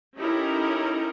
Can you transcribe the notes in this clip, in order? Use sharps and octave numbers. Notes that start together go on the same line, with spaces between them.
C#4 D#4 E4 G4 A4 A#4